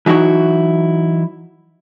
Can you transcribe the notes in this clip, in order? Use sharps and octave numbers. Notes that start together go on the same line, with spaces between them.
E3 F#3 D#4 E4 F#4